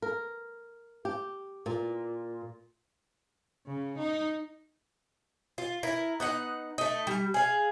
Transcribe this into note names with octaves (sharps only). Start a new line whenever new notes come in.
A#4
G4
A#2
C#3
D#4
F4
E4 A#4
B3 D#4 F#5
A3 D#4
G3
G#4 F5